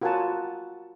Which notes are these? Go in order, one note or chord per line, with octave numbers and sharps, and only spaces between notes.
F4 F#4 A#4 F#5 G#5 A5